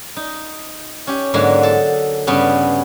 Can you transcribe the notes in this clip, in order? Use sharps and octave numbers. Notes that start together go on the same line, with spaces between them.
D#4
C#4 G4
G#2 D3 F#3 G#3 A#3
A4 A5
G2 C#3 B3 C#4